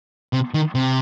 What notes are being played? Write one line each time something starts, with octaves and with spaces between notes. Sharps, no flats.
C3
D#3
C3